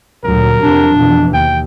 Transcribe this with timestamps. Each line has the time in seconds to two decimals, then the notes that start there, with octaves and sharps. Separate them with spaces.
0.24 D2 A#2 F#3 A#4
0.62 F2 C3 D4
0.97 F2 B2 E3
1.34 D#2 G5